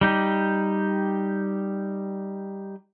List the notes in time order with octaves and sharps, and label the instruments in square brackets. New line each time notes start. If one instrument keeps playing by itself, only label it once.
[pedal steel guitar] G3 D#4 G4